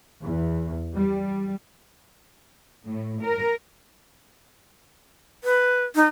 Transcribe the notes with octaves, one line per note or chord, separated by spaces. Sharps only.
E2
G3
A2
A#4
B4
D#4